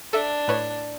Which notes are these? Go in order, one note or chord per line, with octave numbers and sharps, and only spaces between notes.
D4 A4 E5
A2 B4 C#5